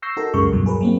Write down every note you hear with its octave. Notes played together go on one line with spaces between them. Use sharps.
C#6 E6 G6 A#6 C7
D#4 F#4 A4 A#4
C#2 F#2 C#3 G#3 A#4 C#6
E2 G2 B2 F#3
G#4 A#4 B4
F#3 A#3 C4